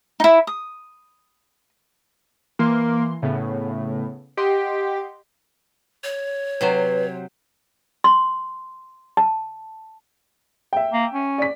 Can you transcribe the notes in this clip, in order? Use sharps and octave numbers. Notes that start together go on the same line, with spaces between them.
D#4 E4
D#6
E3 A#3 C6
A2 C#3 B3
G4 D#5 F#5 C6
C#5
C3 F#3 B4 C5
C6
A5
E5 G5
A#3
C#4
D5 B6